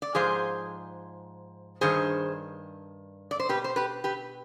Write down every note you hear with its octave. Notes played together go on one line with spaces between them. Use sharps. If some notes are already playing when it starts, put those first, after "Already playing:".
D5
G#2 F3 G#4 C5
G2 D#3 G#4 C5
D5
C5
B2 G4 B4
C5
G4 B4
G4 B4